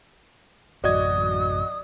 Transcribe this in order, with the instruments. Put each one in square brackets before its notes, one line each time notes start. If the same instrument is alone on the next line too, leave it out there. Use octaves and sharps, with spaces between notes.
[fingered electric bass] A1 F#2 [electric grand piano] F#4 D#5 G#6 [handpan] D5 [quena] D#6